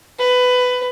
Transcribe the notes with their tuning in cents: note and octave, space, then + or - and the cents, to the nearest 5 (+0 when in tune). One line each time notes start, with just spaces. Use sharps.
B4 +15